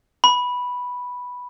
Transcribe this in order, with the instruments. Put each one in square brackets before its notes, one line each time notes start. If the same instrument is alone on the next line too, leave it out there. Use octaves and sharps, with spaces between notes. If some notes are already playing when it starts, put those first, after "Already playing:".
[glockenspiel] B5